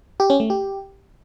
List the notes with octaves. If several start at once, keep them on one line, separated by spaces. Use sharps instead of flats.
G4
C#4
A3
G4